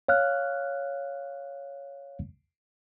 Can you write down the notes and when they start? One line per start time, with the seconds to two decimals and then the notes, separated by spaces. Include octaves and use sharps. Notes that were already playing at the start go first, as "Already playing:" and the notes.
0.08 C#5 F5 F6 F#6